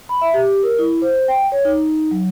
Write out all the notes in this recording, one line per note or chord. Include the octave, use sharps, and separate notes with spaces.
B5
E5
G4
A#4
E4
C5
G5
C#5
D#4
F#3